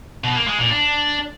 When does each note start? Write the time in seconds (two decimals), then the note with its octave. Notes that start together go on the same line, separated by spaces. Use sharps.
0.24 B2
0.35 A#3
0.47 G#3
0.59 A#2
0.70 D4